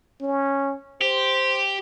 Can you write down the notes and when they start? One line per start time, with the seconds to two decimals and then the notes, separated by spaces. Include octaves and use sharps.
0.21 C#4
1.01 G4 C5